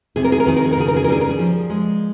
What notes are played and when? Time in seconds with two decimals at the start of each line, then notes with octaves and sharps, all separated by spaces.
0.16 C3 G#4
0.24 A#4
0.32 G#4
0.40 A#4
0.47 D#3 G#4
0.56 A#4
0.64 G#4
0.72 A#4
0.77 C#3 G#4
0.88 A#4
0.96 G#4
1.04 A#4
1.08 G3 G#4
1.21 A#4
1.29 G#4
1.39 F3
1.70 G#3